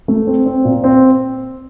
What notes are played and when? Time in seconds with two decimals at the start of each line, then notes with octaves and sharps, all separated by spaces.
0.08 A3
0.27 C4
0.46 C4
0.65 A#2
0.84 C4